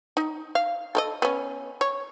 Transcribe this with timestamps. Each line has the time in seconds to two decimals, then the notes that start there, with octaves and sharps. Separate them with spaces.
0.17 D#4
0.55 F5
0.95 A4 A#4 D#5
1.22 B3 C#4
1.81 C#5